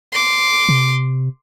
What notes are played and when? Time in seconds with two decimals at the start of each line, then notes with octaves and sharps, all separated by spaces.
0.12 C6 D6
0.69 C3